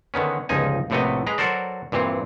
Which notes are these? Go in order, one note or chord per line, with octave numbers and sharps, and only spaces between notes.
D3 D#3 B3 C#4
G1 C#2 F3 D#4 G#5
A#1 A2 C3 A3 B3 D#5
G#3 B4 A#5
F#3 F#4 A4 A#4 C5 D5
G2 A#2 E3 C4